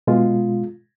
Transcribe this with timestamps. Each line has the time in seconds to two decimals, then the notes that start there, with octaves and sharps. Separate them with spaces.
0.07 B2 G#3 F4